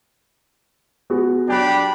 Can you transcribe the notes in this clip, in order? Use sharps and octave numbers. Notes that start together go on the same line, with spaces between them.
B3 F#4 G#4
F#3 D4 G4 B5 F#6